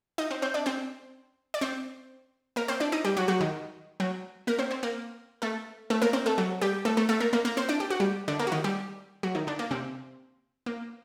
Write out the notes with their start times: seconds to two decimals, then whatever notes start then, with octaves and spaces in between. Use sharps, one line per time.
0.18 D#4 D#5
0.31 C4 C5
0.42 C4 C5
0.54 D4 D5
0.66 C4 C5
1.54 D5
1.61 C4 C5
2.56 A#3 A#4
2.68 C4 C5
2.80 D4 D5
2.92 D#4 D#5
3.04 G3 G4
3.17 F#3 F#4
3.28 F#3 F#4
3.41 D#3 D#4
4.00 F#3 F#4
4.47 A#3 A#4
4.59 C4 C5
4.71 C4 C5
4.83 A#3 A#4
5.42 A3 A4
5.90 A3 A4
6.02 A#3 A#4
6.13 C4 C5
6.26 A3 A4
6.38 F#3 F#4
6.62 G3 G4
6.85 A3 A4
6.97 A3 A4
7.09 A3 A4
7.20 A#3 A#4
7.33 A#3 A#4
7.45 A#3 A#4
7.57 C4 C5
7.69 D4 D5
7.80 G4
7.90 F#4
8.00 G3 G4
8.28 D3 D4
8.39 A#3
8.47 F#4
8.52 D#3 D#4
8.64 G3 G4
9.23 F#3 F#4
9.35 D#3 D#4
9.47 D3 D4
9.59 A#3
9.71 C3 C4
10.66 A#3